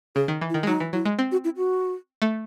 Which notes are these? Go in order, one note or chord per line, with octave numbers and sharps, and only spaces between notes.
C#3 G#4
D#3
E3
E4
D#3
G#3
F#3 D#4
E3
F#3 E4
G#3
C4
F#4
E4
F#4
A3